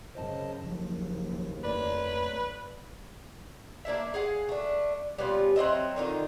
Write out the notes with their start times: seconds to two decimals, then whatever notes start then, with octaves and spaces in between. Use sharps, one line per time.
0.15 F#2 C#3 C5 D#5 A5
0.64 F#1 D#2 F3 F#3
1.64 F2 A3 B4 C#5 D5
3.85 A#3 D4 E4 E5
4.14 G#4 F5 F#5
4.49 A3 D4
5.18 G3 B3 C#4 F4
5.56 F#3 C4 D#5 E5
5.96 D3 D#3 D#4 F4